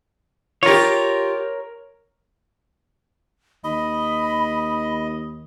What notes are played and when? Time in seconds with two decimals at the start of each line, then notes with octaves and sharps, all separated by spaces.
0.63 F4 G4 A#4 C#5
3.64 D#2 D#5 B5